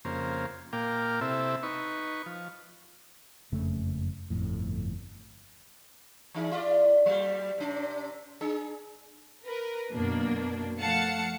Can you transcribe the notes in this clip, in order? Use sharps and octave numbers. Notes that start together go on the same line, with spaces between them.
F2 C#3 A#3 C5
A#2 A#3 F5 G5 D6
C3 C4 E4 A4 E5
D#4 B4 C#6
F3
F#1 F2 C#3 A3
G1 F2 A2
E3 D#4 G#4
E4 D5
F#3 G3
C3 C#4
D4 G#4
A#4 B4
F#2 B2 A#3 D4
F3 A3 F5 F#5 A5 C#7